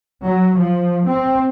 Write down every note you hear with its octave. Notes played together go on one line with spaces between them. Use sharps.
F#3
F3
C4